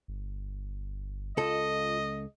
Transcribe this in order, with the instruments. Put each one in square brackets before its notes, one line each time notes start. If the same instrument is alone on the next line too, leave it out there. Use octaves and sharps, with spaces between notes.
[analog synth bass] G1
[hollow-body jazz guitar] C#2 A4 [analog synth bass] F4 [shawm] D#5